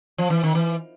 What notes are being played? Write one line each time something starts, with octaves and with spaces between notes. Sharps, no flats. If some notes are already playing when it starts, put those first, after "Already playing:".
F3
E3
D#3
E3